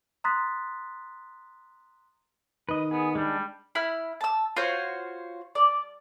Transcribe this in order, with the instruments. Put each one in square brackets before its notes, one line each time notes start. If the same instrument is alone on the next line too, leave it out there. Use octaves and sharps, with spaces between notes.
[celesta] A#5 C6 D#6 F#6 A6 B6
[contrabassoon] D#3 [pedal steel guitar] B4 D#5
[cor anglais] B3 [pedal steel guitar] G#4
[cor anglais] G3 [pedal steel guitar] G#3 D4
[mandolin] E4 B5 F6
A5 E6
F4 F#4 C5 C#5
D5